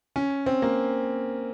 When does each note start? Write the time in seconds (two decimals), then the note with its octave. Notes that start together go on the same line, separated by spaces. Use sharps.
0.16 C#4
0.46 C4
0.62 A#3